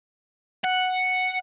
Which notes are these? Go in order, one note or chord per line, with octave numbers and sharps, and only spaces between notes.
F#5